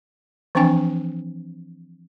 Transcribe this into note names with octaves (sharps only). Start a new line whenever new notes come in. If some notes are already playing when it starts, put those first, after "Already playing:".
E3 F3 C4 D4 G5 G#5